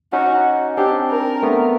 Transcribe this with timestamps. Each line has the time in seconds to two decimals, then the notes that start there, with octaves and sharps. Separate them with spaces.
0.13 C#4 D#4 F#4
0.77 C4 D4 G4
1.10 A#4
1.42 A3 B3